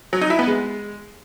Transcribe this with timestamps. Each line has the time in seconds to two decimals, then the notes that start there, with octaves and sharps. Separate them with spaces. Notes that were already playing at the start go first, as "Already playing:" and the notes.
0.13 F#3
0.21 D#4
0.30 E4
0.39 B3
0.48 G#3